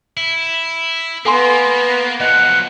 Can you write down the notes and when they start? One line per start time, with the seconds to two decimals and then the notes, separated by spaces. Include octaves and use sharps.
0.17 E4
1.25 A#3 B3 A4 G#5 C6
2.20 F3 F#3 D#5 F#5